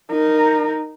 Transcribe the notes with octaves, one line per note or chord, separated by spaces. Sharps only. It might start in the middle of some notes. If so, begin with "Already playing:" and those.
D#4 A#4